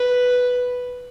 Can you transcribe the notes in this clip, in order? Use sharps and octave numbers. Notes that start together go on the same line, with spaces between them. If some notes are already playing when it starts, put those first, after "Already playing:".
Already playing: B4